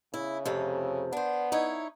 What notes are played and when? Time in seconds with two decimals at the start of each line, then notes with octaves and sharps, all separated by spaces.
0.14 C#3 E4
0.46 F2 C3 A3
1.13 B3 D4 C5
1.52 D#4 E4 C#5